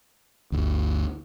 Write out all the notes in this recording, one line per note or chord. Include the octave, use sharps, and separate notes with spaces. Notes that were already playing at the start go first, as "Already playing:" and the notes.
G1 D2